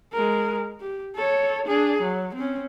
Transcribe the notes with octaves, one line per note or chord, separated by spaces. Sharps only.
G#3 A#4
G4
A4 C#5
D4 G#4
F#3
C4 C#4